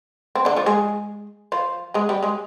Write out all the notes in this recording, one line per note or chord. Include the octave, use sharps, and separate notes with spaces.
C4
D3 D4
F3 F4
G#3 G#4
F3 F4
G#3 G#4
G3 G4
G#3 G#4